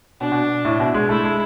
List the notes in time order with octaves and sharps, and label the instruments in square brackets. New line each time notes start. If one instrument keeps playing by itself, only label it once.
[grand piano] B2 [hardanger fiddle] D4
[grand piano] B2
A2
B2
G#3
[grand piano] A3 [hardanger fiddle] E4
[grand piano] G#3